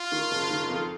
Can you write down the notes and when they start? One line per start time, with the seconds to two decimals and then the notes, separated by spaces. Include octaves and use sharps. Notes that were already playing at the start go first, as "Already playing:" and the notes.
Already playing: F4
0.12 D#3
0.31 F#1
0.50 D#3
0.69 F2